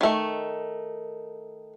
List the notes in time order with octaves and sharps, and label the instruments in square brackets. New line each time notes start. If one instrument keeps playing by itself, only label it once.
[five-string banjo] D#3 A3